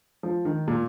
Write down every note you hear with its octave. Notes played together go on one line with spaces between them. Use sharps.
F3
D#3
A#2